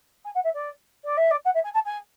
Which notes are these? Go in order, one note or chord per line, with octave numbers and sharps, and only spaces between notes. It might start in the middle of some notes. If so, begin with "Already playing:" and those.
G#5
F#5
E5
D5
D5
E5
D5
F#5
E5
G#5
A5
G#5